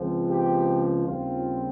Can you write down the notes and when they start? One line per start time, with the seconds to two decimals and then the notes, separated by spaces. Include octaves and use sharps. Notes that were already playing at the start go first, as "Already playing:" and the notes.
Already playing: C#2 C#3 F3 C4
0.29 G4
1.05 D#2 C#3 G3 C4 F4